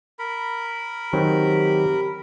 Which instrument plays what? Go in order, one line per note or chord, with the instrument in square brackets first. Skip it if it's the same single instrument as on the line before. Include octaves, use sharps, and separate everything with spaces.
[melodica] A#4 B5
[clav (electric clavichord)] D#3 F#3 C4 [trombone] G4